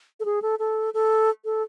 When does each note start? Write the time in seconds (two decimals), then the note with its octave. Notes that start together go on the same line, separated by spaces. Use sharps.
0.20 A4
0.25 G#4
0.42 A4
0.59 A4
0.94 A4
1.45 A4